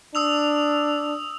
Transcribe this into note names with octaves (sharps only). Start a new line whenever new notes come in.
D4 D#6 E6 F7